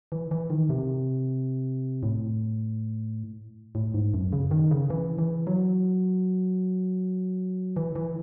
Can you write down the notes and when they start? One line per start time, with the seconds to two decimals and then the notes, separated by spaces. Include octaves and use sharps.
0.12 E3
0.31 E3
0.50 D#3
0.69 C3
2.03 A2
3.75 A2
3.94 G#2
4.14 F#2
4.33 C#3
4.51 D#3
4.71 C#3
4.90 E3
5.18 E3
5.47 F#3
7.76 E3
7.95 E3